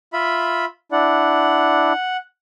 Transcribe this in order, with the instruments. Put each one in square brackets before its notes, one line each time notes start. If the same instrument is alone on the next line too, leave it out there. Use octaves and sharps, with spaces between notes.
[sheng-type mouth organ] F4 E5 B5
[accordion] D4 E4 D5 [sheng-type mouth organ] F#5